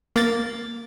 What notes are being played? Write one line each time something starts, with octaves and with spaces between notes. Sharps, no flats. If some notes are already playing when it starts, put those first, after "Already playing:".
A#3 A6